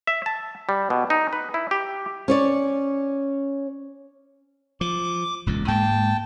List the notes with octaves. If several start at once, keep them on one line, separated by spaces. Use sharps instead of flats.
E5
A5
G3
B2
D#4
B4
E4
G4
C#4 C#5 D5
F3 D6
E1 C#2 A#2
G#2 G#3 A#3 G5 A5